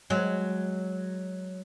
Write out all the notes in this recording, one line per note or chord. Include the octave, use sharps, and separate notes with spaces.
F#3 G#3